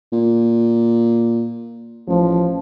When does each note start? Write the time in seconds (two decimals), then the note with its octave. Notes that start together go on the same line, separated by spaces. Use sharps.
0.13 A#2
2.08 A1 F3